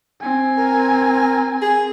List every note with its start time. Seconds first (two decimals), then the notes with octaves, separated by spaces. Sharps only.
0.21 C4 G#5
0.58 A#4
1.62 G#4